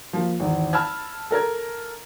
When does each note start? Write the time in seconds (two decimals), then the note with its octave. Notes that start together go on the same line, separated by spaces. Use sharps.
0.13 F3 A#3
0.40 G#1 E2
0.73 A5 B5 E6 F6 G#6
1.31 A4 A#4 A#5 G#6